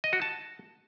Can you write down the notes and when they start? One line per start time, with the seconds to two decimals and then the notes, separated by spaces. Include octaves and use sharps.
0.04 D#5
0.13 F#4
0.22 A5